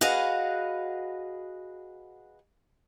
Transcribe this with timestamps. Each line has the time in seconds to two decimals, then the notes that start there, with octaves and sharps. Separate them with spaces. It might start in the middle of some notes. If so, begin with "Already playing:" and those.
0.01 F#4 G#4 B4 D#5 F5 F#5